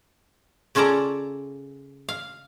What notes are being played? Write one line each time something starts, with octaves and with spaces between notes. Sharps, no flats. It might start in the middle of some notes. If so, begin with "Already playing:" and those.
C#3 C#4 F4 A4 D5 A#5
F5